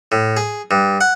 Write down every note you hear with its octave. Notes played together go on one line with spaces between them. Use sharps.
A2
G#4
G2
F#5